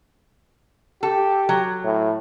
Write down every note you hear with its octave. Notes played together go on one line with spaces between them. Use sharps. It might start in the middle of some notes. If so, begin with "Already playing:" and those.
G4 A4
F#3
A2